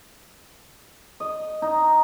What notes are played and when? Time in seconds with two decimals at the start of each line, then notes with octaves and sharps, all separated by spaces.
1.20 D#5
1.62 D#4